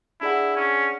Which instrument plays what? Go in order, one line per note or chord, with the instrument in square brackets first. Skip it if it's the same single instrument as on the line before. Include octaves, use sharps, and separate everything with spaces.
[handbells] D4 G#4 D5 F#5 [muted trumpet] E4
[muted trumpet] C#4